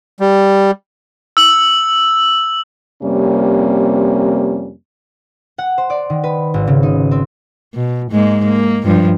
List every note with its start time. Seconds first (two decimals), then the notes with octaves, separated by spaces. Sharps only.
0.20 G3
1.37 E6 F#7
3.03 F2 C3 G3 A#3 C#4
5.58 F#5
5.78 C5
5.90 D5
6.10 D#3
6.24 B4
6.54 G#1
6.67 C#3
6.83 D#4
7.11 C4
7.75 B2
8.11 G#2 G#3 A#3
8.45 A#3
8.85 G2 F3